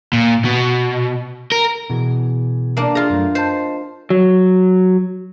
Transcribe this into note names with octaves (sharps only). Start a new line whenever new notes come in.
A#2
B2
A#4
B2 E3 G#4
A#3 D4
F4 G#4 A#4 A#5
F#2 A3
C5 D#5 A5
F#3